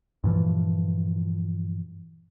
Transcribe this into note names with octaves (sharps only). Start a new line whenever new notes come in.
G2 A#2 E3 F3